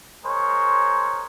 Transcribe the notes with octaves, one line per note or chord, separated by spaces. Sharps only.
G#3 A#4 C5 C#5